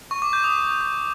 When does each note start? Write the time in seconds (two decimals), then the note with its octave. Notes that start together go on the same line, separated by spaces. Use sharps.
0.11 C#6
0.22 D6
0.33 G6
0.44 D#6